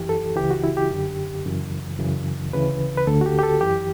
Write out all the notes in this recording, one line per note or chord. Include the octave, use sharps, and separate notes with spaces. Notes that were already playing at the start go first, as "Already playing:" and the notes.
Already playing: F#2 E3 G4
A4
C#2 C#3 E3 G4
F#4
E4
G4
F#2 D3
F#2 C#3 E3
F#2 C#3 E3
D2 C#3 E3 B4
B4
D2 D3 A4
F#4
G4
G4
A4
F#2 E3 G4